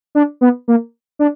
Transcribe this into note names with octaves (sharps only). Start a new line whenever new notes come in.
D4
B3
A#3
D4